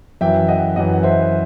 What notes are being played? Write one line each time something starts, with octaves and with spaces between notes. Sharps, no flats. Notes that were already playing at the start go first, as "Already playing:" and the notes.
F#2 E3 E5 G5
D#5 F#5
F#2 E3 D#5 F#5
F#5
C5 E5